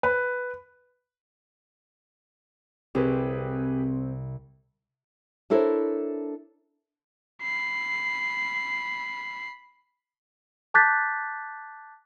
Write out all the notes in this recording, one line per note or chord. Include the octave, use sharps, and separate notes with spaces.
B4
C2 C4 G4 G#4 B4
D4 E4 A4 A#4 C5 C#5
B5 C7
A5 D6 F#6 G6 A6 B6